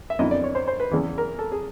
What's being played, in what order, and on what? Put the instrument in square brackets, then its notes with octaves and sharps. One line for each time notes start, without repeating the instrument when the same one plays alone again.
[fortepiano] E5
F2 D3 F#3 B3 E4 D#5
D5
C#5
C5
C5
B4
E2 C#3 E3
A#4
A4
G#4